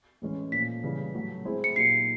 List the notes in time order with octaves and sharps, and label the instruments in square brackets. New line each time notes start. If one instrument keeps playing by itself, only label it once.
[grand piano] A2 E3 G#3 C#4
[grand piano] A#2 F3 A3 [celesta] B6
[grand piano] C#3 E3 G3
A2 F#3 A3
G#3 C4 E4 G#4 C5
[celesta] C#7
[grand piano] A#2 F#3 A#3 D#4 G4 [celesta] C7